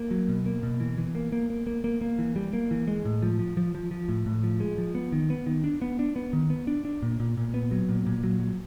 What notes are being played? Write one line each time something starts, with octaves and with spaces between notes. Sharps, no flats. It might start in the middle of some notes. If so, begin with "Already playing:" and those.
Already playing: A#3
F#3
B2
A#3
B2
E3
E3
A#3
A#3
A#3
A#3
A#3
A#3
E3
G3
A#3
E3
G#3
A2
F3
F3
F3
F3
F3
A2
A2
F3
G#3
F3
B3
D#3
B3
D#3
D4
B3
D4
B3
D#3
B3
D4
D4
A#2
A#2
A#2
B3
F#3
A#2
A#2
F#3
F#3